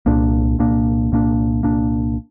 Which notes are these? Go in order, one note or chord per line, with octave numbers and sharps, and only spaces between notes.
C2 A#2 A#3 D4
C2 A#2 A#3 D4
C2 A#2 A#3 D4
C2 A#2 A#3 D4